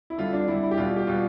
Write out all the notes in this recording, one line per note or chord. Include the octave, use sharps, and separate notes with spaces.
E4
D3 G3 F4
D4
D3 G3 E4
E4
G4
B2 G3 F4
G4
B2 G3 F4